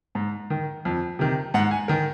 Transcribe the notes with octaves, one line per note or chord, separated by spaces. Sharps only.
G#2
D#3
F2
C3 D#3
G#2 F#5
G#5
D#3 A#4